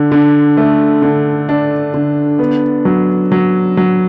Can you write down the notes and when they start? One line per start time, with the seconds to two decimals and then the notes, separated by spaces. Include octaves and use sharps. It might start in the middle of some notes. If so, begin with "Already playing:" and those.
Already playing: D3
0.12 D3
0.57 A3
1.02 D3
1.49 D4
1.94 D3
2.39 B3
2.85 F#3
3.32 F#3
3.77 F#3